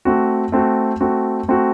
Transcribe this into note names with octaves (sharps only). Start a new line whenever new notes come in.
A3 C4 F#4
A3 C4 F#4
A3 C4 F#4
A3 C4 F#4